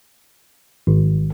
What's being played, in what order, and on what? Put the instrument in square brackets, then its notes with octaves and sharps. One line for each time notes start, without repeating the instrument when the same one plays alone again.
[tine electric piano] G#1